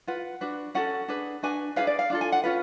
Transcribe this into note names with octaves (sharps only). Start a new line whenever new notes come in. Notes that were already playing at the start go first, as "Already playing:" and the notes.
F4 B4 F#5
D4 F#4 B4
C#4 F#4 A4 F#5
D4 G#4 B4
D4 F#4 B4 G#5
D4 F4 G#4 B4 F5
D5
F5
D4 F4 A4
G#5
F#5
C#4 F4 B4